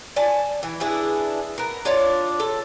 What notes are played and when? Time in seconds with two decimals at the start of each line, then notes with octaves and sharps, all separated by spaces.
0.16 D5 G#5 A5
0.63 E3
0.80 D4 E4 G#4 B4
1.58 B3 A#4
1.85 D4 F4 C#5 D5
2.40 A4